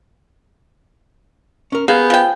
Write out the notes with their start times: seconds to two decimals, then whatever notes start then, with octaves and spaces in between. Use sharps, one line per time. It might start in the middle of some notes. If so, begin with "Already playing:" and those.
1.72 C#4 A#4
1.88 A#3 B3 G#4 F5 G6
2.10 F3 G5